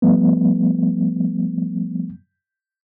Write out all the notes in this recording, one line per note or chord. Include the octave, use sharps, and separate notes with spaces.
F3 G3 A3 B3